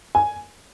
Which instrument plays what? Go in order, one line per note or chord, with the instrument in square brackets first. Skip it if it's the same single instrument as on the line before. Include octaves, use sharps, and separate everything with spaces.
[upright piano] G#5